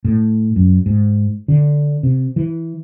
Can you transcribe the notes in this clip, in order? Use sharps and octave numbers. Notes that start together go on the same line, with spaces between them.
A2
F#2
G#2
D3
C3
E3